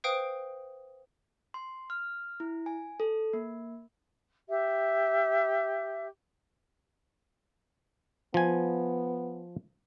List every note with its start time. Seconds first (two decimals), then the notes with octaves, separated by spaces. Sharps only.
0.04 B4 C5 F5 G5 D#6 D7
1.54 C6
1.90 F6
2.40 E4
2.66 G#5
3.00 A4
3.33 A#3
4.49 G4 E5
8.34 F3 B3 G#5